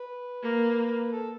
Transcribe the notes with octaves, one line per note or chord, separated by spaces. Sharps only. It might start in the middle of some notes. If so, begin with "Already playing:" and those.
Already playing: B4
A#3
A4